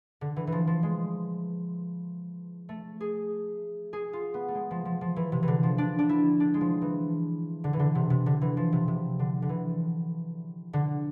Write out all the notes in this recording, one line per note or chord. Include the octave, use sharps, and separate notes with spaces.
D3
E3
E3
F3
F3
G#3
A3
G#4
G#4
F4
B3
A3
G#3
F3
F3
F3
E3
C3
E3
D3
F3
D4
D4
E4
D4
G#3
F3
E3
D3
E3
D3
C3
C3
D3
E3
F3
C3
C3
D3
D3
E3
D3